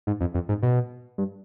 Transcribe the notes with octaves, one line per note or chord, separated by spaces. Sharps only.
G#2
F2
F2
G#2
B2
G2